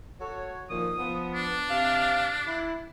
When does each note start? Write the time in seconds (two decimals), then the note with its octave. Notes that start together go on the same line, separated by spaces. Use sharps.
0.21 F#4 A4 C#5
0.70 A#2 D#3 F3 D#6
0.97 F3 B3
1.34 D4
1.70 C3 F5
2.47 E4